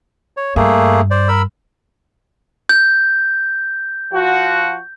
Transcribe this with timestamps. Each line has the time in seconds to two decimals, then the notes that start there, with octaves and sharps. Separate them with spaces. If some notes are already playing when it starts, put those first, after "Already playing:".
0.37 C#5
0.56 G2 A3 A#3 G#4
1.11 C5 D5
1.28 A#4 B5 E6
2.69 G6
4.13 F3 F#4